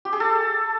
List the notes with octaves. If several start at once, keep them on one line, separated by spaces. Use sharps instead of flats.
G4
G#4
A4